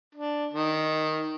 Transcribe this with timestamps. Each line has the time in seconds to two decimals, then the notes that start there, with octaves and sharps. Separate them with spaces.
0.15 D4
0.53 D#3